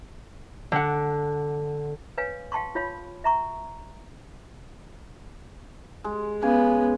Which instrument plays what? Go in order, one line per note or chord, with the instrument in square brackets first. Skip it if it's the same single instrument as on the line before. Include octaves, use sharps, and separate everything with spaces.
[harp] D3 F#5
[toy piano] B4 C#5 F5 G#5
F5 G5 A5 C6 C#6
F4 C#5 F5 B5
E5 A#5 C#6
[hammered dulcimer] G#3
[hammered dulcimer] C#3 G#5 D6 [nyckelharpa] B3